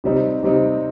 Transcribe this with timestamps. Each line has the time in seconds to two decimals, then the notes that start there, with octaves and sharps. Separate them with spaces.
0.04 C3 G3 C4 D#4
0.43 C3 G3 C4 D#4